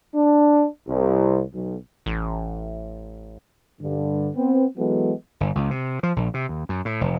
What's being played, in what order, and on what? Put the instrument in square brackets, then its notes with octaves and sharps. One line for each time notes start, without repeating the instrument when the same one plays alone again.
[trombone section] D4
C2
B1
[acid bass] A1
[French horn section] G2 D3
B3 C4
E3 F#3 G#3 B3 A4
[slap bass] G1
C#2
C3
F3
A#1
C3
D#2
F#2
A2
F1